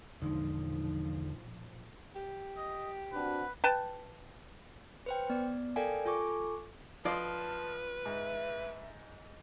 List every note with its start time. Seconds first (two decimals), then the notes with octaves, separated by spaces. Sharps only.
0.22 B1 E2 A#2 D3 F3 G#3 D#4
2.16 G4
2.57 D#5
3.13 C4 D4 F#4 B4
3.64 B4 G5 A5
5.06 B4 C5 G5
5.30 B3 D5
5.76 A4 A#4 D5 F5 G5 G#5
6.05 F4 A4 G#5 C#6 D6
7.05 F3 F4 B4 D5 D#5 F5 A5
8.06 G#2 E5